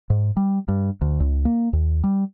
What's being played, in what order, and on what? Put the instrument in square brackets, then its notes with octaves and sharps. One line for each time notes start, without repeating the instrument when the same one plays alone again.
[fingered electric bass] G#2
G3
G2
D2
C#2
A#3
D#2
G3